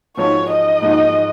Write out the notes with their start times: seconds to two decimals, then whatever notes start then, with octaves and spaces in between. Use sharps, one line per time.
0.17 G#2 F3 G#3 D#4 F#4 C#5
0.50 D#5
0.82 G#2 F3 G#3 D#4 F#4